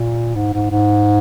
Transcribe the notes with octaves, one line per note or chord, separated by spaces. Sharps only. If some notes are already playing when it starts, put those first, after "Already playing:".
Already playing: A#2
G#2
G#2
G#2